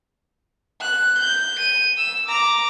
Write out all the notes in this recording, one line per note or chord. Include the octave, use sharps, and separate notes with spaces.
F#6
G6
D#7
E6
A#5 D6